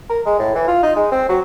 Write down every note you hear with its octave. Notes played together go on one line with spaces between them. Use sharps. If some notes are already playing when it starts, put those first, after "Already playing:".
A#4
G#3
A2
E3
F4
D#4
G#3
C4
F#3